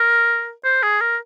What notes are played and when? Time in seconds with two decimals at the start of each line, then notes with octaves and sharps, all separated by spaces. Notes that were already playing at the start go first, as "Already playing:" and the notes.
Already playing: A#4
0.65 C5
0.83 G#4
1.01 A#4